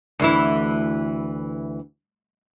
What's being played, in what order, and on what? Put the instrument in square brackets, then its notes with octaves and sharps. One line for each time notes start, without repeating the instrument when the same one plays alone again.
[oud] D2 E3 E4